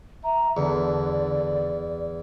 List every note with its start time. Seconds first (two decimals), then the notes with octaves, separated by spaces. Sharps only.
0.24 E5 A#5
0.57 E2 D3 D5